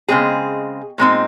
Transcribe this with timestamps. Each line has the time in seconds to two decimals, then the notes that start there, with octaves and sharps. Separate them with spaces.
0.08 C#3 G#3 C4 G#4
0.98 A#2 G#3 C4 D#4